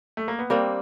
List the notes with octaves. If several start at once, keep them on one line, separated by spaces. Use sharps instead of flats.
A3
A#3
B3
G3 A#3 C4 D4